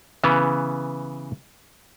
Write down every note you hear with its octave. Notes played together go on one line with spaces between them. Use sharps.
C#3 E3 B3